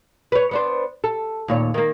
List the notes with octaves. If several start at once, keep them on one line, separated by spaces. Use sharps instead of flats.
B4 C#5
B3 D4 C5
A4
D#2 A#2 C#5
D#3 A#3